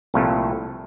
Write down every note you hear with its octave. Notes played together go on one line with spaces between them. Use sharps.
C2 A#2 F3 A3